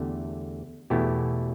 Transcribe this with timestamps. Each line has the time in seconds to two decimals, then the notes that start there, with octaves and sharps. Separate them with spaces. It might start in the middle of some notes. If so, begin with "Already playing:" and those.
Already playing: E2 D3 A3 G4
0.90 E2 B2 A3 E4 G4